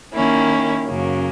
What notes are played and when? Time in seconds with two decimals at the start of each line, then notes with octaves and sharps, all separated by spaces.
0.13 D#3 A#3 C#4 E4
0.85 F#2 C#3 F#3 A#3 C#4